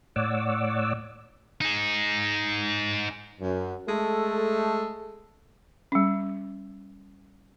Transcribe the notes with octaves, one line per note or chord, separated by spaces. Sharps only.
A2 C#5 D5 F#5 D6 E6
D#4 G#4
F#2
G#3 A3 A4
G3 C#4